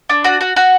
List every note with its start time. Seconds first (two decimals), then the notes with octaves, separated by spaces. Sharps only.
0.10 D4
0.24 F#4
0.41 F#4
0.56 F#4